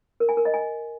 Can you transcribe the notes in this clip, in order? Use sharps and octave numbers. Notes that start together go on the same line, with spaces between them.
A#4
G#5
A#4
D#5
G#5